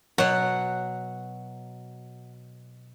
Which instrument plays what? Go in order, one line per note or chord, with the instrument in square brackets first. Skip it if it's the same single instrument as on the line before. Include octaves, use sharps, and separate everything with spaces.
[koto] B2 F#3 [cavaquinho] F#5